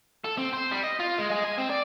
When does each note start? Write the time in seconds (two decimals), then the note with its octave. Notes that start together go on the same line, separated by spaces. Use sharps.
0.25 A4
0.38 C4
0.54 C5
0.72 G3
0.84 D#5
1.00 F4
1.18 G#3
1.31 G#3
1.44 G#5
1.58 C4
1.70 D5